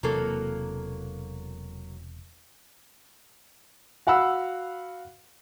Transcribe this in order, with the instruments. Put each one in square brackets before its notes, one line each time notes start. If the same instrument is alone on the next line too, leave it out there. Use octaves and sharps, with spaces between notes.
[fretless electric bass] E1 C3 E3 [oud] F#3 A#3 A4
[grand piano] F#4 F5 F#5 B5 E6